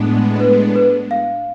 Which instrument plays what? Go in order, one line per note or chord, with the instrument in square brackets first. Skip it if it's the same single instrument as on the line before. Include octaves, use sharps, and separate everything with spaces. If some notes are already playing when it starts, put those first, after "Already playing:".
Already playing: [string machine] A2 G#3 B3 D4
[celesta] B4
B4
F5